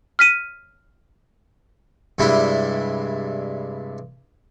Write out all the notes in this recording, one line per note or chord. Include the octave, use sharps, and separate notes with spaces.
F6 B6 D#7
G2 C3 G3 G#3 D4 E4